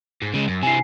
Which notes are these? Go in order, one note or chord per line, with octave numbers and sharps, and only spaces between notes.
G#2
C#3 G#3
F#2
C3 E3 G#5 C7